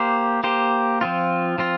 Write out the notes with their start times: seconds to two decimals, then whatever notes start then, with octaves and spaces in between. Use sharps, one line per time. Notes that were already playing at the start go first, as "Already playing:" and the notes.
Already playing: A#3 G4 C5
0.44 A#3 G4 C5
1.01 F3 C4 F4
1.58 F3 C4 F4